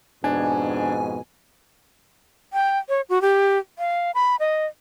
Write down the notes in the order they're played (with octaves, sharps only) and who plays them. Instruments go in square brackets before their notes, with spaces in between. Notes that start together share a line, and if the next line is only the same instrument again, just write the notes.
[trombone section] F2 G#2 B2 [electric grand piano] D4 [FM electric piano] G#5
[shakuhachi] G5
C#5
F#4
G4
F5
B5
D#5